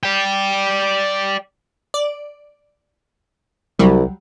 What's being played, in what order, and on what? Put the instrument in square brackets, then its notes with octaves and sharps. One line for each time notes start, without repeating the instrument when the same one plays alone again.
[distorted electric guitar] D5 G5
[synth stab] D5
[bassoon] C2 [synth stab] F#3 G3